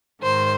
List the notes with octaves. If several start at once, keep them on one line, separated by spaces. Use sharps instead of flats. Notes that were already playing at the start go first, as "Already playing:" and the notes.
G#2 D#3 C5